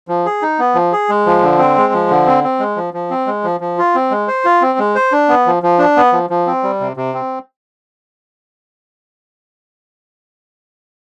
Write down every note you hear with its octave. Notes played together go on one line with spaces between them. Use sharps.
F3
G#4
D#4
B3
F3
G#4
G#3
F3
D3
C4
G#3
F3
D3
C4
C4
G#3
F3
F3
C4
G#3
F3
F3
F4
C4
G#3
C5
F4
C4
G#3
C5
D4
B3
F3
F3
D4
B3
F3
F3
C4
G3
C3
C3
C4